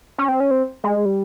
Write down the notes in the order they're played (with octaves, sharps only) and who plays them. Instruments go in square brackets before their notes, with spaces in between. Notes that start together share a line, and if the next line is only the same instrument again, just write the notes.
[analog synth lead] C#4
C4
C#4
C4
G#3
G3